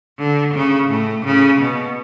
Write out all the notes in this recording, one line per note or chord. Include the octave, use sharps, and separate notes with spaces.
D3
C#3
A2
C#3
B2